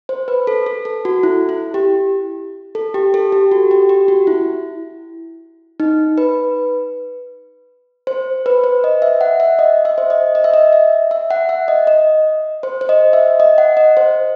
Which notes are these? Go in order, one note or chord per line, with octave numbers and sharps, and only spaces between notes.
C5
B4
A4
A4
A4
F#4
E4
E4
G4
A4
G4
A4
G4
F#4
G4
G4
F#4
E4
D#4
B4
C5
B4
C5
D#5
E5
F#5
E5
D#5
E5
C5
D#5
D#5
E5
D#5
E5
E5
F#5
E5
D#5
D#5
C5
C5
D#5
E5
D#5
F#5
D#5
C5